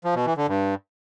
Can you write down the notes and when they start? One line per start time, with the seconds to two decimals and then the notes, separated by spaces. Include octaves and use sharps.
0.04 F3
0.15 B2
0.26 E3
0.37 D3
0.48 G2